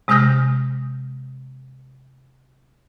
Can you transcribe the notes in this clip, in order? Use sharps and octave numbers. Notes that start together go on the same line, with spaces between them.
C3 G#3 D#6 F6 G6 A#6